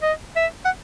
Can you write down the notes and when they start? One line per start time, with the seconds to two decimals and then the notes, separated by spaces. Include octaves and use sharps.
0.02 D#5
0.36 E5
0.65 F#5